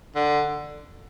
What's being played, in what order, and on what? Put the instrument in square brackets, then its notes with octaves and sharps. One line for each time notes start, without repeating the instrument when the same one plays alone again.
[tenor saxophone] D3